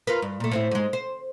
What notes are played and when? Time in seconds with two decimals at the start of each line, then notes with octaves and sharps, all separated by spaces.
0.07 F4 A#4 B4
0.22 G2
0.40 A#2 A3
0.51 A2 C4 E4
0.71 G#2 G#3
0.93 C5